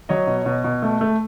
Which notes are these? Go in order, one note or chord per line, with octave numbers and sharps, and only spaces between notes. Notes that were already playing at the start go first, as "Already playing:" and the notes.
F#3 C#5 D#5
B2
B2
B2
A3
A3